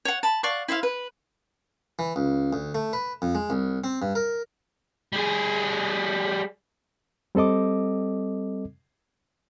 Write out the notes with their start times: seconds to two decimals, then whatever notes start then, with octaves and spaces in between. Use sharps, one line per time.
0.05 C#5 F#5
0.23 A5 B5
0.43 D5 F5 F#5 C#6
0.68 E4 C5 E5 F5
0.83 B4
1.99 E3
2.16 C#2
2.53 D2
2.75 A3
2.93 B4
3.22 F2
3.35 G#3
3.50 C2
3.84 C4
4.02 G2
4.15 A#4
5.13 G3 G#4
7.35 G3 C4 A4 D#5 D6